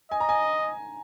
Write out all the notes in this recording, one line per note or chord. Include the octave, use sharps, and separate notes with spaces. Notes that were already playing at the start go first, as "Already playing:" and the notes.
D#5 G#5
A#5
G#5